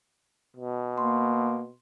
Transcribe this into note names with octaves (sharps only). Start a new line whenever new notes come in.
B2
A#3 C6